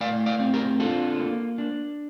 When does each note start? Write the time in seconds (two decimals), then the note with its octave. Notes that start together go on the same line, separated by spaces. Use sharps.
0.01 A2 D5 F5
0.26 D5 F5
0.40 C4
0.54 G4 A#4
0.80 D4 F4 A4
1.19 A#3
1.58 D4